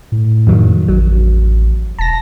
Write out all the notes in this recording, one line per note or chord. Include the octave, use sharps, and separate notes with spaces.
A2
F2 D#3 F#3
A1 F#3
E1 A5 A#6